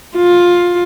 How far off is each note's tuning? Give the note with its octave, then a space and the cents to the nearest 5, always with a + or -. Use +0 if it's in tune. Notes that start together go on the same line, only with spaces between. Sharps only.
F4 +15